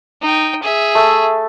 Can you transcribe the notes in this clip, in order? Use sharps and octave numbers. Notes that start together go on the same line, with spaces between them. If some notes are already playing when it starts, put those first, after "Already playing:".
D#4 G5
G#4 E5
A3